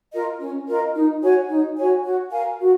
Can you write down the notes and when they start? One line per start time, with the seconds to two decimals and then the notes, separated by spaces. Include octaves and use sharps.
0.12 F4 A#4 D#5
0.40 C#4
0.67 F4 A#4 D#5
0.95 D#4
1.22 F#4 C#5 G#5
1.49 D#4
1.77 F#4 C#5 G#5
2.04 F#4
2.31 A#4 F5 G#5
2.60 F#4